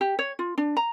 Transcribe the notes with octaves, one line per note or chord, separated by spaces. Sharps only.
G4
C#5
F4
D4
A#5